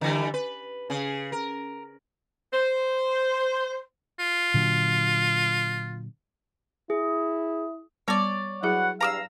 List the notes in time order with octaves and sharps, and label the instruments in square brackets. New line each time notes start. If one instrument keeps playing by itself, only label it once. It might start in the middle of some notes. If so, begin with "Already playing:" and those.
[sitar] D3 E3 G3
B4
C#3 G#4
A#4
[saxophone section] C5
[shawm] F4
[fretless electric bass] A#2 D3 F#3
[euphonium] E4 [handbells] G#4
[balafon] G3 B3 [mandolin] C#5 D5
[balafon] F#3 E4 G#4 [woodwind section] F#4 B4 F#5
[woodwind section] E2 G2 F5 [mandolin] A#5 D6 E6